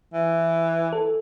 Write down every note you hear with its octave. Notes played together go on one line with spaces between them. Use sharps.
E3
A4